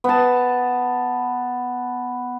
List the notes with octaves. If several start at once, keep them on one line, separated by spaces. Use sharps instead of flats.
B3 A5